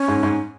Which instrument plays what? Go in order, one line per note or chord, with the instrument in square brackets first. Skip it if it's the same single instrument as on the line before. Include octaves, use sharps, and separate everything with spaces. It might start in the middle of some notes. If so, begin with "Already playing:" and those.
Already playing: [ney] C#4
[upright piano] G#2
G#2